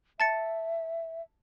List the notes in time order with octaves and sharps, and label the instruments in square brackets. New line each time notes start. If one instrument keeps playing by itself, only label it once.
[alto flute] E5 [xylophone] A5 A6 C#7